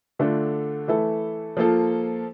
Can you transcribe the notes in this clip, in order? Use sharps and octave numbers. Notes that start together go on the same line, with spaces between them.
D3 A3 D4 F4 A4
E3 A3 E4 A4
F3 A#3 F4 A4